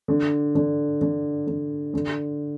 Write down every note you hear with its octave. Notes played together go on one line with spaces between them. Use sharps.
D3
D3
D3
D3
D3